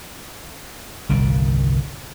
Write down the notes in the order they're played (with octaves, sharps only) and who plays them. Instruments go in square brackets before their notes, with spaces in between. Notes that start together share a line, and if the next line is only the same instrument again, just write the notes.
[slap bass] G1 C2 A#2 D#3